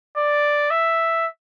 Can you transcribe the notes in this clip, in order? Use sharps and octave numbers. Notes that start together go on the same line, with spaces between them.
D5
E5